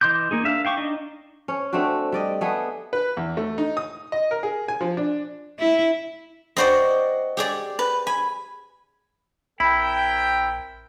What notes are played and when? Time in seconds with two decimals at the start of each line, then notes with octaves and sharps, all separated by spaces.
0.01 E3 D#5 C6 D6 G6
0.31 A#3 D#4 G#4
0.44 D4 E5 F5
0.65 F5 G5 C#6 D6
0.77 D4 D#4 D#5
1.48 C#4 C#5
1.73 A3 C4 D4 F#4
2.12 G3 D5 D#5
2.41 A3 B3 G#4
2.93 B4
3.17 E2
3.37 A3
3.58 D#4
3.77 D#6
4.12 D#5
4.31 A#4
4.43 G#4
4.68 G#5
4.81 F3
4.97 D4
5.59 E4
6.57 C4 F#4 C5 D5 D#5
7.37 G4 G#4 D5
7.79 B4
8.07 G#5 B5
9.60 A#1 C4 E4 A#4 G5 B5